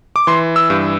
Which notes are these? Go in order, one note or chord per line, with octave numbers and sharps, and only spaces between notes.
D6
E3 C6
E6
G2